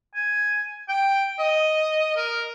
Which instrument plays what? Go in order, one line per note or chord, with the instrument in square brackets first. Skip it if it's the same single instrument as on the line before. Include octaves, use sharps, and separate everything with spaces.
[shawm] G#5
G5
D#5
A#4